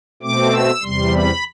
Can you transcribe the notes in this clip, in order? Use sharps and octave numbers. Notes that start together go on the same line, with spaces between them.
B2 A3 C4 D6
E6
E2 C3 G3 C6
B5